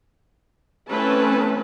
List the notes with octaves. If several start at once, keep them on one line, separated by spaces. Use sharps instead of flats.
E3 A3 C4 C#4 B4 A5